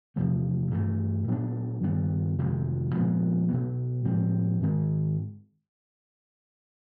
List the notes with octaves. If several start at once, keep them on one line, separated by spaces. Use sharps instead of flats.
E2 C3 F3 A3
G2 E3 A3
A#2 F#3 B3 D4
G2 D#3 G3 B3
F2 C3 D#3 G#3
A#2 F3 G#3 B3
B2 F#3 B3
A2 F3 G#3 C4
G#2 D#3 G#3